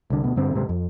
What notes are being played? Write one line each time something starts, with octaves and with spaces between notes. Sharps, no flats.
C2 D3
D2 B2
G2 D3 C4
D#1 G#2 C3 C4
F2